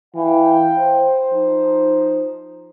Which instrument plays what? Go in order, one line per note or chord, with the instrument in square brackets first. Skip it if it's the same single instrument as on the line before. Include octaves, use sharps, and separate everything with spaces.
[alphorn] E3 [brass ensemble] F5 G5
[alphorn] C5
[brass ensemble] F3 D#4